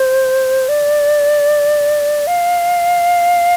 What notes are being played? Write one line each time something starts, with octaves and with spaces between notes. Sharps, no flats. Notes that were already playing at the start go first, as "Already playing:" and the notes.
Already playing: C5
D5
F5